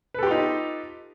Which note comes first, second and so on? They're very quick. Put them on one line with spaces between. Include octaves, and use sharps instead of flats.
B4 A4 G4 F4 D#4